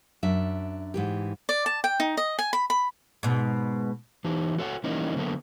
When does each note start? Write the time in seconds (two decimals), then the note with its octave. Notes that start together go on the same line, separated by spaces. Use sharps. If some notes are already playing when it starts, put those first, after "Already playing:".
0.23 F#2 D4 E5
0.94 G#2 E3 G4
1.49 D5
1.66 A5
1.84 G5
2.00 D#4
2.17 D#5
2.39 G#5
2.53 B5
2.70 B5
3.23 G#2 B2
4.24 E3 D#4 G4
4.58 F#4 A4 C#5 E5 F#5
4.84 E3 G3 A#3 C#4 D#4
5.16 D3 F#3 A#3 B3 A4